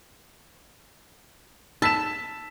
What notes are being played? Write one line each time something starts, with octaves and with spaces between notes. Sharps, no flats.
A5 E6 B6 E7